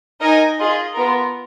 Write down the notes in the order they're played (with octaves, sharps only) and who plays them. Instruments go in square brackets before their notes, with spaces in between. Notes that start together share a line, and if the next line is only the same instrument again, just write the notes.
[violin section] D#4 A#4 D#5 G#5
F4 G#4 D#5
B3 F4 A#4